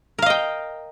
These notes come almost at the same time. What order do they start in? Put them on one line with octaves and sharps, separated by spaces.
A#4 F5 D#5 G5